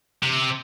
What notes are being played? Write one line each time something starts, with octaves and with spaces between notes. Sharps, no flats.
C3